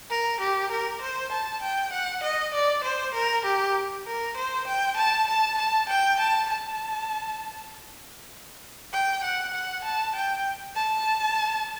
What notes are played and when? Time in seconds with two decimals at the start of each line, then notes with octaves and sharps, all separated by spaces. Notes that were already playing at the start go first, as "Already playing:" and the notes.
0.10 A#4
0.40 G4
0.71 A#4
1.02 C5
1.32 A5
1.62 G5
1.93 F#5
2.23 D#5
2.54 D5
2.84 C5
3.14 A#4
3.45 G4
4.06 A#4
4.37 C5
4.67 G5
4.97 A5
5.27 A5
5.58 A5
5.89 G5
6.20 A5
6.50 A5
8.93 G5
9.24 F#5
9.54 F#5
9.84 A5
10.15 G5
10.75 A5